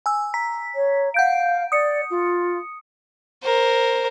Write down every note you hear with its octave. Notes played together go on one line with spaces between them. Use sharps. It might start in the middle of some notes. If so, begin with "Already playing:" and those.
G#5 E6
A#5 B6
C#5
F5 F#5 G6 D7
D5 D#6 C#7
F4
A#4 C5